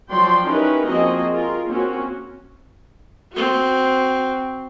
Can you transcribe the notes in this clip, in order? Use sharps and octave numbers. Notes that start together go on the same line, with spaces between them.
F3 F#3 F4 D5 G5 C6
C#4 D#4 E4 G4 A#4 B4
F3 A#3 C4 F#4 G#4 D#5
F4 G#4 A#4
A#3 C4 C#4 F#4
C4 F#4